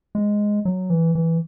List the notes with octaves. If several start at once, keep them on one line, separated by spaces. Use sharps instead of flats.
G#3
F#3
E3
E3